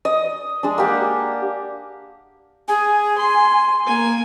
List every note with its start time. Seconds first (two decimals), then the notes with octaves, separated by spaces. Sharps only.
0.05 D#5
0.63 G#3 D4
0.78 A#3 G4 F#5
2.68 G#4 G#5
3.18 C6
3.86 A#3 G#5